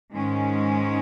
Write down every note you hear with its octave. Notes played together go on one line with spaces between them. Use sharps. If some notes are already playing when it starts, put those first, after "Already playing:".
G#2 D#3 G#3 C#4